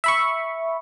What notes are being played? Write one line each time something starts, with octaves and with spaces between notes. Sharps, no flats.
E5 B5 C#6